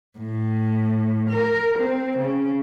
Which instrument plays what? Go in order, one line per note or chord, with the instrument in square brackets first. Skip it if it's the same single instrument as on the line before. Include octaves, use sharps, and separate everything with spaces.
[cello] A2
A#4
C4
C#3